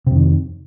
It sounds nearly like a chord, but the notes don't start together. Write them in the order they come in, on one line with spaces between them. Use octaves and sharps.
C3 F2 D#3